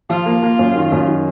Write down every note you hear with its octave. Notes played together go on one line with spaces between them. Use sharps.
F3 F4
A#3
A#3
F#2
D#3
F#2
D#3